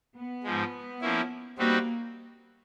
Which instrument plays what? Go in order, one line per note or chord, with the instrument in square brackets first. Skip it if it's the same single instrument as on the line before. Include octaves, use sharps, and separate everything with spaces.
[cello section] B3
[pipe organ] G#2 F3 G#3
F3 A#3 C#4 E4
[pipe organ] G3 C4 D#4 F#4 B4 [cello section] A#3